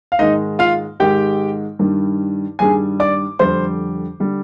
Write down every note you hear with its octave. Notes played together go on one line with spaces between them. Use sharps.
F5
G#2 D#3 G#3 D#4 D#5
F4 F5
G#2 D#3 G#3 G4 G5
G2 D#3 G3
G2 D#3 G3 G#4 G#5
D5 D6
F2 D3 G3 C5 C6
D3 G3